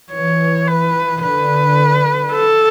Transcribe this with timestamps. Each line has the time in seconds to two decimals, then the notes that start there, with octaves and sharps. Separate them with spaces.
0.12 E3 C#5
0.67 B4
1.22 D3 B4
2.32 A4